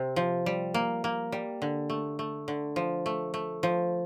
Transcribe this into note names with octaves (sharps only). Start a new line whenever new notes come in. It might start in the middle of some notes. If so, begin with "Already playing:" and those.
Already playing: C3 C4
F3
G3
A#3
A#3
G3
D3
A3
A3
D3
F3
A3
A3
F3